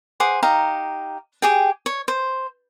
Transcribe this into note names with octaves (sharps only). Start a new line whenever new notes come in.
G#4 C5 F#5 D6
D#4 G4 F5 A#5
G4 G#4 G5
C#5
C5